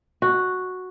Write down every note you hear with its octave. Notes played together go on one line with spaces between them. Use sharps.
F#4